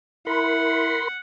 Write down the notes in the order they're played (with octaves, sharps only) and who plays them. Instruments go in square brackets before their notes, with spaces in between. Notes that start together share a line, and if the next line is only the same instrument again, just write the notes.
[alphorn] E4 [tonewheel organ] A#4 B5 C6 [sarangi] F#5